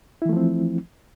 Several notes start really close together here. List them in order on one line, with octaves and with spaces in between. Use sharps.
E4 E3 A3 F3 C4